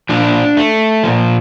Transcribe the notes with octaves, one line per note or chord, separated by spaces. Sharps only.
A#2 F3 D4
A3
A#2 F3